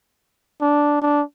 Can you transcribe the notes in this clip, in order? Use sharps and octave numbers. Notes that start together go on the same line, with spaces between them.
D4
D4